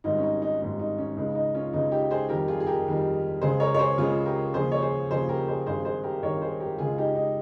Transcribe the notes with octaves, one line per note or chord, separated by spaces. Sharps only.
G#1 G#2 D#3 G3 D#4
C#4
D#4
D#4
G#1 G#2 D#3 G3 D#4
D#4
C#4
C#2 C#3 G#3 D#4
D#4
C#4 F4
C#2 C#3 G#3 D#4
D#4 G4
G#4 C5
F2 D#3 G3 G4 A#4
F4 G#4
G#4
G4 A#4
F2 D#3 G3
C#2 C#3 G#3 G#4 C5
A#4 C#5
C#5
G#4 C5
C#2 C#3 G#3 F4 G#4
G4 A#4
D#2 C#3 F3 G#4 C5
C#5
G#4 C5
D#2 C#3 F3 G#4 C5
G4 A#4
G#4 C5
G#1 G2 D#3 G#4 C5
G#4 C5
G4 A#4
G#1 G2 D#3 A#4 C#5
G#4 C5
G4 A#4
C#2 C#3 G#3 F4 G#4
D#4 G4
D#4